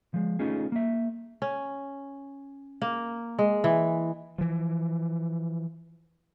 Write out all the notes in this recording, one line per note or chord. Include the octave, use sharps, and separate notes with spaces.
F3 G#3
A3 C#4 D#4 F4 G#4
A#3 E5
C#4
A#3
G#3
E3
E3 F3